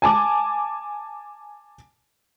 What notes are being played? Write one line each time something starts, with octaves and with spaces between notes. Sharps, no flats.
G#5 A5 D6